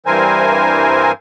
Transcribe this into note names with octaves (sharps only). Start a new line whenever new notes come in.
G2 E3 C4 A#4 C5 G#5